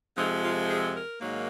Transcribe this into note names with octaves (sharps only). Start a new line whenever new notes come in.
F2 C3 F3 G#3 D#4
F4
G#4
A#4
G#2 D#3 F#3 A#3